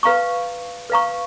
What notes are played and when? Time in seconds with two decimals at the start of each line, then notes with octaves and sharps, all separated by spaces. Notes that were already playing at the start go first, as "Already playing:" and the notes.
0.03 B4 F5 A#5 C#6
0.90 B4 F5 A#5 C#6